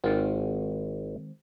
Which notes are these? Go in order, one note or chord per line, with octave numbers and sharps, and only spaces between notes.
G#1 D#3 G#3 C4 F4 F#5